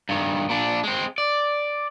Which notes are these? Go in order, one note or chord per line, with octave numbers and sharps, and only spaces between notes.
G2 D#3
A#2 D4
G#3 C4
D5